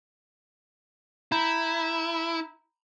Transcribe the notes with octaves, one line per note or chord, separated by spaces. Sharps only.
E4 A#5 B5 G6